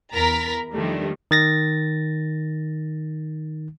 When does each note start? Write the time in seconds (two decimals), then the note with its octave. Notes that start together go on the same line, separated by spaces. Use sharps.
0.14 E2 A#4 A#5 B5 A6 B6
0.72 D#3 F3 G3 A3 D4
1.31 D#3 A6 A#6